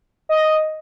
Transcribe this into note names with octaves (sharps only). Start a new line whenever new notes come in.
D#5